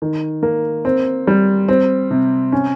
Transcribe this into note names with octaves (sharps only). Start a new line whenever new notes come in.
D#3
A#3
C4
G3
C4
C3
C#4